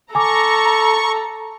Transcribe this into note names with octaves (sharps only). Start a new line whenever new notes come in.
A4 G#5 A#5 C#6 D6